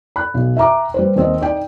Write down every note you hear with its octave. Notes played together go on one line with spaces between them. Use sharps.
B5 F#6
B1
E5 G5 A#5 D6
G3 B4 C5
D#2 C4 D#5
D#4 D5 G5